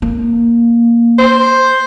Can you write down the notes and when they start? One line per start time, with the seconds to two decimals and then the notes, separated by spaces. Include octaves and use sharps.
0.02 A#3
1.18 C5